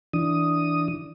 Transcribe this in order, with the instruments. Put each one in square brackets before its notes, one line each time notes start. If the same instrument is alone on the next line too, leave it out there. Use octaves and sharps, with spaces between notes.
[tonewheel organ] E3 D4 D#6